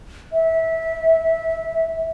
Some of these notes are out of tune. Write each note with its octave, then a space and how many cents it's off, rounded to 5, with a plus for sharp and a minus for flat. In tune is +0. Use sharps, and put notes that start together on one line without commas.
E5 -15